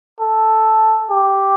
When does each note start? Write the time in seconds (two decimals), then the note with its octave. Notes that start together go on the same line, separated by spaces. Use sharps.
0.20 A4
1.10 G4